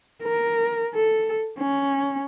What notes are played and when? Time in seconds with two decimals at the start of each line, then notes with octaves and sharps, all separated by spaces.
0.23 A#4
0.94 A4
1.59 C#4